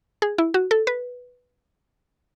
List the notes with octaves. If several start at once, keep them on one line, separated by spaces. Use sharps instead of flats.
G#4
E4
F#4
A4
B4